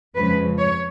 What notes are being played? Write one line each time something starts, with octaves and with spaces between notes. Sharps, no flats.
F2 C#3 F3 G#3 B4
C#5